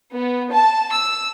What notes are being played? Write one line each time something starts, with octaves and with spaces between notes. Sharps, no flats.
B3
A5
E6